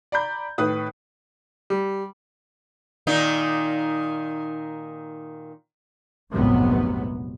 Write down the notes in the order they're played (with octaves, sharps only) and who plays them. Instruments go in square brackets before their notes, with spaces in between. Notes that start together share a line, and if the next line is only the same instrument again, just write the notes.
[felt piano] D5 A#5 B5 G6
A2 D#3 B4 D#6
[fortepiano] G3
[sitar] A#2 D#3 D#4
[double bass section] F1 A#1 G#2 C3 F#3 B3